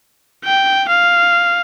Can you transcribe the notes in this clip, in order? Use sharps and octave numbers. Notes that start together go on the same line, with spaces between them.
G5
F5